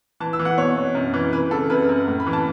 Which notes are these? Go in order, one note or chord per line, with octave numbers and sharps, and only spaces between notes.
E3 A5
E6
E3
F#5
B2 C#5
B2
F#2
E3
E3 B4
C#3 A4
F#2 B4
F#2
A2
B5
E3
A5